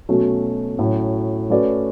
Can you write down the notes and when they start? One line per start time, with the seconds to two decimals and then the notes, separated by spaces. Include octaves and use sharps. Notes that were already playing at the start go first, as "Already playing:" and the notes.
0.09 B2 F#3 A3 C#4
0.79 A2 F#3 C#4 F#4
1.50 A3 C#4 F#4 B4 D5